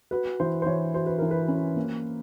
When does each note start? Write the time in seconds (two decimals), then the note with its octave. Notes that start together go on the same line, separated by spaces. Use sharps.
0.11 F#4 B4
0.40 E3 C5
0.62 C5
0.66 E3 C#5
0.94 F#4 C5
1.06 B4
1.18 E3 A#4
1.31 B4
1.48 C#4
1.76 A#3